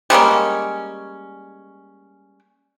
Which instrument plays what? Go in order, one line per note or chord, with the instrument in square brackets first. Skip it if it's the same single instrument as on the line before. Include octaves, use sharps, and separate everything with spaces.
[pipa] G3 G#3 A#3 C#4